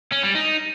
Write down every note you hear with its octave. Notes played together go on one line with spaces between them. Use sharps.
C#4
G3
D#4